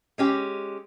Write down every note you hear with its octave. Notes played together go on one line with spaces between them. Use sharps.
G#3 C#4 G4